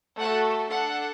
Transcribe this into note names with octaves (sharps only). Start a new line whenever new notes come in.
A3 F#4 A4 F#5
D4 A4 F#5